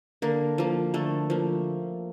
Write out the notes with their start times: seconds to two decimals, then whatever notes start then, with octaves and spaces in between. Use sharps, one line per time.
0.22 D3 A#3 A#4
0.58 F3 A#3
0.94 D3 A3 A4
1.30 F3 A#3